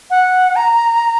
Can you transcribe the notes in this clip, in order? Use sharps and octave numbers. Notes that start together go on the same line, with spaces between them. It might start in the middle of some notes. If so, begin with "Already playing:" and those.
F#5
A#5